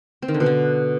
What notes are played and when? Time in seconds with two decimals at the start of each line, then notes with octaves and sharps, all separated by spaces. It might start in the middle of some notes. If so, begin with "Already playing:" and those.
0.22 C4
0.28 D#3
0.34 D3
0.40 B2
0.46 D3